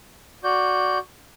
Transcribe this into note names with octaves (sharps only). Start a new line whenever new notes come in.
F#4 D5 G6